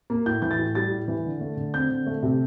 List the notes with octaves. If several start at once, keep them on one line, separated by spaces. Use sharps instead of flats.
A#3
A2 G6
E3 G6
A6
A2
G3 A6
A2
E3
D3
A3
D3
C4 G6
D3
A3
C3